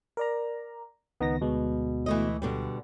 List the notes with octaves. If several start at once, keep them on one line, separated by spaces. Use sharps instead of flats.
A#4 D5 A#5
C#2 D#3 B3 D#4 A#6
D2 B2 G#3
E3 A3 D#5
B2 D3 G3